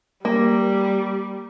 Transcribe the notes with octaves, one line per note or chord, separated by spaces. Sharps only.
G3 A#3